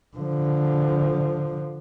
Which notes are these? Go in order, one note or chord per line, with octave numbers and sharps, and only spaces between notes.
D3 F3